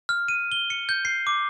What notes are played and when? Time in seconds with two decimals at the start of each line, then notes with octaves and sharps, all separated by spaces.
0.09 F6
0.28 D#7
0.52 G7
0.70 C#7
0.89 G6
1.05 C7
1.27 D6